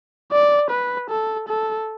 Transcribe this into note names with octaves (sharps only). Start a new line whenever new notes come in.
D5
B4
A4
A4